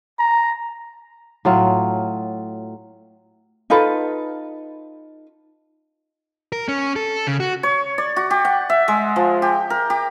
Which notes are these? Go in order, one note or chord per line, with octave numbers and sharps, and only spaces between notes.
A#5
A2 F#3 F4
D#4 F4 A4 B4
A#4
C#4
A4
C#3
F#4
C#5
D5
F#4
G4
F#5
E5
G#3
F3
G4
A#4
G4